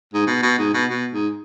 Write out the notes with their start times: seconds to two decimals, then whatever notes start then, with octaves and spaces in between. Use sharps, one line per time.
0.14 G#2
0.27 B2
0.43 B2
0.58 G#2
0.74 B2
0.90 B2
1.13 G#2